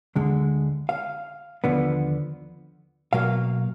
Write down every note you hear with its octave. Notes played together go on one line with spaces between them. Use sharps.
D2 D3 G#3
F5
D#2 D3 F3 B3
B2 F#3 A#3 F5